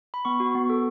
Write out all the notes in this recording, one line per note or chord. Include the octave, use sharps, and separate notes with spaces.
B5
B3 C#6
F#4
B3
A4